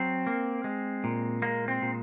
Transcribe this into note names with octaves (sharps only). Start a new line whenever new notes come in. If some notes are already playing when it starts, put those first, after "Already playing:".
Already playing: F#3 C4
A#3
G#3
A#2
G#3 A#3
C4
A#2